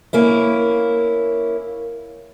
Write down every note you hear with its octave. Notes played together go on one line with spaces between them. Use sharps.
A#3 C#4 E4